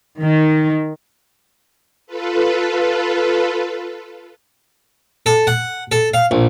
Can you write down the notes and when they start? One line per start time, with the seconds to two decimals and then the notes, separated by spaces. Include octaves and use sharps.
0.22 D#3
2.07 F4 A4 B4
5.26 A4
5.47 F#5
5.92 A4
6.14 F5
6.31 A#1